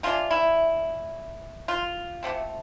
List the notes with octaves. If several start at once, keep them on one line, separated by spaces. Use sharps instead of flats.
C3 G#3 B3 D4 F4
E4
F4
C3 F3 A3 C4